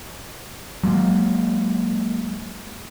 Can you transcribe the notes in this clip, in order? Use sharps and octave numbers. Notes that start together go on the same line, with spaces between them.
F#3 G#3 A#3